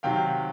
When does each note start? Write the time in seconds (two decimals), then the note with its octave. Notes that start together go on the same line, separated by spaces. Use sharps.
0.03 C3 D#3 F#3 F5 G5